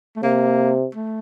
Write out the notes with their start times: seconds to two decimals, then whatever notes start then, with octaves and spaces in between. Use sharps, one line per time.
0.16 A3
0.23 C3 A#3
0.95 A3